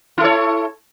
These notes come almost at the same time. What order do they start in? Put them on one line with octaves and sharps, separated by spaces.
E4 A4 C#5